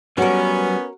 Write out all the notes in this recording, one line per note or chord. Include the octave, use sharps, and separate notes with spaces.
F#3 G3 B3 C#4 F#4 A#4